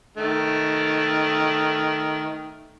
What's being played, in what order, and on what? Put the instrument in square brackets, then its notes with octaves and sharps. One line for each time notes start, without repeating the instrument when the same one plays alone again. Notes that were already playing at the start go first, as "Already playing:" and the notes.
[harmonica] D#3 A3